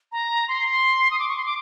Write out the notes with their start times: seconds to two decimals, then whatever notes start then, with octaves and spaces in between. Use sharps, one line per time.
0.12 A#5
0.48 C6
1.11 D#6
1.19 D6
1.29 C#6
1.37 C6
1.46 D6